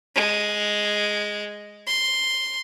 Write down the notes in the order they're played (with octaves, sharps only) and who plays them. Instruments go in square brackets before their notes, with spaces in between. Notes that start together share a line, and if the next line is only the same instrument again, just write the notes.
[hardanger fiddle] G#3
C6